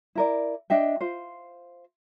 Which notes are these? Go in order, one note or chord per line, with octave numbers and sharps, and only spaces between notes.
E4 A#4 D5
D4 D#5 E5 G5
F4 C5